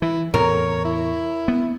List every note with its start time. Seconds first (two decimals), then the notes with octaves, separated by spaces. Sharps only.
0.02 E3 E4
0.34 E2 A2 C3 A#4 C#5
0.85 E4
1.48 B3